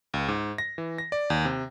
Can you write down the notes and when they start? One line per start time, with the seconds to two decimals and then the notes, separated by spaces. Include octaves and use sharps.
0.14 C#2
0.28 G#2
0.58 A#6
0.78 E3
0.98 A#6
1.12 D5
1.30 D#2
1.45 C3